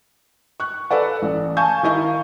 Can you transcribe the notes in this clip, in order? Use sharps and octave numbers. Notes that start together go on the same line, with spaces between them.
C#6 F#6
A4 B4 D5 F#5
A1
F5 G#5 A5 C#6 G6
D#3 E4 D#5 F5 C#6